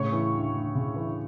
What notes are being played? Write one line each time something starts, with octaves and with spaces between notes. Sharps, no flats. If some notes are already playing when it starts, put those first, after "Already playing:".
Already playing: A2 C#3 C#5 C#6
E3
D2
D2
C#3
E3